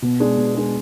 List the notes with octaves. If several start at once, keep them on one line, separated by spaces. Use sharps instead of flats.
B2
G#3 D4 G#4
B2
G#3 D4 G#4